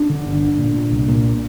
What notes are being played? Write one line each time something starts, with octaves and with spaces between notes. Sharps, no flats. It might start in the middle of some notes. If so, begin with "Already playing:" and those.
Already playing: D4
D3
G1
D3
A#2
A#2
C2
A#2